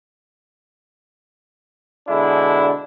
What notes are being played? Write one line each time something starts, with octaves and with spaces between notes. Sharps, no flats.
B2 D3 G#3 D4 E4